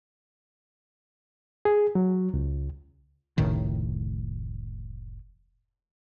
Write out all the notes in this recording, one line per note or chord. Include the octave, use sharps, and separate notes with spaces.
G#4
F#3
C#2
F1 C#2 A2 D#3